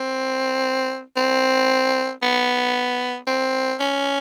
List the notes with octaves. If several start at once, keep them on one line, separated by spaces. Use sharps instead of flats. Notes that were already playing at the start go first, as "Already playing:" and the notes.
Already playing: C4
C4
B3
C4
C#4